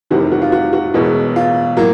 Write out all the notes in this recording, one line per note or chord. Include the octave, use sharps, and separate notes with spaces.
F1 E2 C3 D#3 G3 F#4
F#4
F4
F#4
F#4
E1 E2 B2 G#3 F#4
F4
A2 F#3 A#3